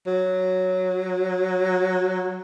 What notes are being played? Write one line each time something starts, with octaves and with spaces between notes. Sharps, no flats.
F#3